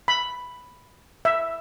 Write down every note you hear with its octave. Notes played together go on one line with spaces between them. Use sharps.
B5
E5